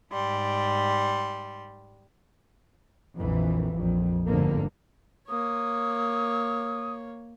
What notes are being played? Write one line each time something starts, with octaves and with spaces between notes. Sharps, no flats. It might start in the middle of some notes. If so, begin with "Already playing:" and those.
G#2 G3 C6
A#1 F2 A#2 E3
A#1 F2
G1 F2 G#2 D3 A#3
A#3 C#5 D#6